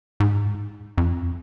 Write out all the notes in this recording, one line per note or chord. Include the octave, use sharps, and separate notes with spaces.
G#2
F2